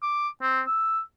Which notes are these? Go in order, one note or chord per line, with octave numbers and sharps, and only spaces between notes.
D6
C4
E6